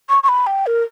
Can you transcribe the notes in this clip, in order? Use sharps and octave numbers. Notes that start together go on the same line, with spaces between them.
C#6
C#6
B5
G5
A#4